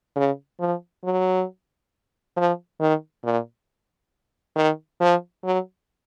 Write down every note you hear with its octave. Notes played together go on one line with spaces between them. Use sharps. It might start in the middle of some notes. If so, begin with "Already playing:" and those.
C#3
F3
F#3
F3
D#3
A#2
D#3
F3
F#3